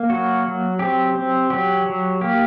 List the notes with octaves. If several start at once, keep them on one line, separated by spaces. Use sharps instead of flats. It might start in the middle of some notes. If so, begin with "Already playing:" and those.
Already playing: A#3
F#3 F#4
F#3
C4 G4
C4
F#3 G4
F#3
A#3 G4